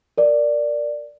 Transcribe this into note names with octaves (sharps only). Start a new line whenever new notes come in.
A#4 D5